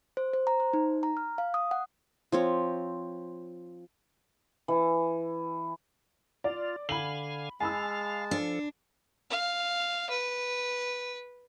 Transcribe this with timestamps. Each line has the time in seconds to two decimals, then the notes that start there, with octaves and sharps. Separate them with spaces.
0.17 C5
0.33 C5
0.47 A#5
0.60 C5
0.73 D#4
1.03 A#5
1.17 F6
1.38 F5
1.54 D#6
1.71 F#5
2.32 F3 C4 C#5
4.68 E3
6.44 F4 D5
6.89 D3 F5 G#5 B5 F#7
7.60 G#3 F5 G#5 A5 B5 E6
8.31 F3 D4 A4
9.30 F5
10.10 B4